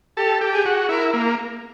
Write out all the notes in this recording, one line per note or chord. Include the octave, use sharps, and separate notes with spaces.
G4 A4
G4
G#4
F#4
E4 A#4
A#3